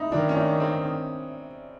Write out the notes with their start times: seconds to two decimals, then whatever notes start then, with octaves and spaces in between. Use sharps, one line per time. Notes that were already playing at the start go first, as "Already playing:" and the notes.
Already playing: D#4 E4
0.12 D#3 D4
0.29 C#4
0.36 D4
0.60 C4